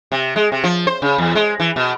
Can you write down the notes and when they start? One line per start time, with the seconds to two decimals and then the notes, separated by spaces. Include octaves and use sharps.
0.12 C3
0.36 G#3
0.52 C3
0.64 F3
0.87 C5
1.02 C#3
1.18 E2
1.35 G#3
1.60 E3
1.76 B2